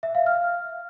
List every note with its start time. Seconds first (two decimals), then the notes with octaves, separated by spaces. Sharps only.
0.03 E5
0.15 F5
0.26 F6